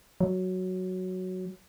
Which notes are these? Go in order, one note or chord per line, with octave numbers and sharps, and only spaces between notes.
F#3